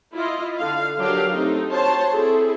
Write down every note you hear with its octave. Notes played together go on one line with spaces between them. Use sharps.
E4 F4 D#5
D3 F5
F#3 D4 G4 A#4 F5
A3 C4 D#4
F#4 C5 C#5 A5
C4 E4 G#4 A4